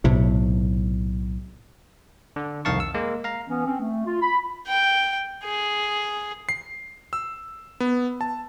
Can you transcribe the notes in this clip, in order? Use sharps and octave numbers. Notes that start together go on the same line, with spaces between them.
B1 A2 C3
D3
C2 F2 D#3 F5 A5 C#6
E6
G#3 A#3
F5 A#5
E3 B3 C#4
C4 C#4
A3
F4
B5
G5
G#4
C7
E6
B3
A5